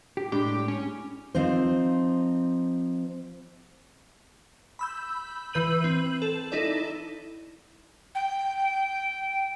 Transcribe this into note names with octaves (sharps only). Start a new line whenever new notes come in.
G4
A2 G#3 D4 G4
C#4
F3 C4 D#4 C5
B5 E6 G6
E3 B4 G6 D#7 F#7
C4 F#7
A4
D#4 E4 A4 D5
G5